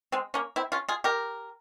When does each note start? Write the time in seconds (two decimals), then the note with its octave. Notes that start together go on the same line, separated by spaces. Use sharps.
0.12 G#3 C4
0.34 A#3 C#4
0.56 C4 E4
0.72 C#4 F4
0.89 F4 G#4
1.04 G4 A#4